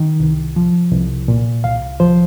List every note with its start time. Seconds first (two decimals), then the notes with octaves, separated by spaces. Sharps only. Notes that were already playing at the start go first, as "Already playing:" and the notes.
Already playing: D#3
0.20 C2
0.56 F3
0.92 C2
1.28 A#2
1.64 C2 F5
2.00 F3 C5